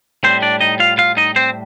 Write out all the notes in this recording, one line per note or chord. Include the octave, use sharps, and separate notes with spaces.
A2 G3 C4 C5
D4 D5
D#4 D#5
F4 F5
F4 F5
D#4 D#5
C4 C5